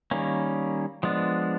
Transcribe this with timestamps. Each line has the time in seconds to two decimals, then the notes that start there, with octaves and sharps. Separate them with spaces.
0.11 D#3 G3 A#3 C#4
1.03 F3 G#3 B3 D4